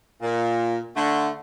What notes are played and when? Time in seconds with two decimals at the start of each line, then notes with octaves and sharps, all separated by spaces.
0.22 A#2
0.96 D3 A3